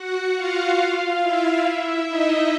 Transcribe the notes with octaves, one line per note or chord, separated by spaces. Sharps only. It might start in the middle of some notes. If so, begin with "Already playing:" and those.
Already playing: F#4 F#5
F4 F5
E4 E5
E4 E5
D#4 D#5